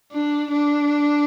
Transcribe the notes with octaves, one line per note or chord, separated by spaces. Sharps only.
D4
D4